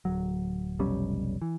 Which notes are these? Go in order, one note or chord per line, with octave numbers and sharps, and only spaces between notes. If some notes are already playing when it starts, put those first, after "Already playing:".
D1 F#3
F1 B1 G3 C#4
E3